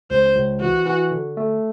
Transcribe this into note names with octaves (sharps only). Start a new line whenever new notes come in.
C#2 C5
C#2
E3 F#4
E3
D3
A3